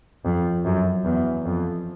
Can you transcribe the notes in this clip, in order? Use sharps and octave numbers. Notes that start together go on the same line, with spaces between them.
F2
F#2
E2
F2